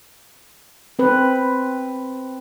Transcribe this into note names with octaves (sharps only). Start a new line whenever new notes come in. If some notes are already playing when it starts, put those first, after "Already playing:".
C4 B4